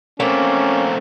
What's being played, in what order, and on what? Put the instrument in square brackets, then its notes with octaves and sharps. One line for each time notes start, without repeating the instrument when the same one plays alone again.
[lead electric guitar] A3 C4 [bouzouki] A#3 [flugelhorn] C#4